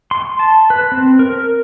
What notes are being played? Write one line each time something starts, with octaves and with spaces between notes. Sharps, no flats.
C6
A5
B4
C4
A#4